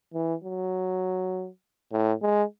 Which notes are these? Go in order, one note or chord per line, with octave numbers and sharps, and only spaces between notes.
E3
F#3
A2
G#3